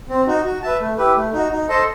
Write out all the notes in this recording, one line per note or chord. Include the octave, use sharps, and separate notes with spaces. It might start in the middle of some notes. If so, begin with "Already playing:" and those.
C4
D#4 F#4
F#4
B4 E5 A5
A3
E4 G4 B4
A3
D#4 F#4
D#4
A4 C5 D#5 A5